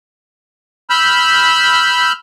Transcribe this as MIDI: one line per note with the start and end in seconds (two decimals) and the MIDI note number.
0.90 2.12 83
0.90 2.12 88
0.90 2.12 89
0.90 2.12 91